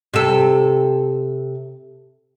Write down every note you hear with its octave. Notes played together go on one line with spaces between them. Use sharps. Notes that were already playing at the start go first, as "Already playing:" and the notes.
C3 A4